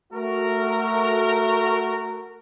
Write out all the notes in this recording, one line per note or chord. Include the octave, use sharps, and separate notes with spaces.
A3 F#4 A#4